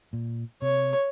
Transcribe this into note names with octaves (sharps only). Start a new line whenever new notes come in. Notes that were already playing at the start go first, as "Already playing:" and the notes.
A#2
C3 C#5